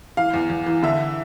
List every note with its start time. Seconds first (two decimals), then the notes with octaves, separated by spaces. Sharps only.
0.17 E3 F5
0.34 E2
0.50 E2
0.66 E3
0.83 D3 E5